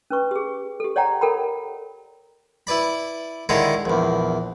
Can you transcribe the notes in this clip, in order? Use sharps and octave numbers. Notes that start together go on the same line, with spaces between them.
C#4 B4 C#6
G4 G#4
G4 A4
C#5 D5 F#5 G5 A#5
A4 A#4 G5 B5
E4 B4 D5 B5
D3 D#3 G#3 E4 C#5 D5
A#1 E2